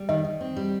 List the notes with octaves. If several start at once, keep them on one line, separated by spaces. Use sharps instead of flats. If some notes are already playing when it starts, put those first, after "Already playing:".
Already playing: G3
D#3 D#5
D#3
C4
G3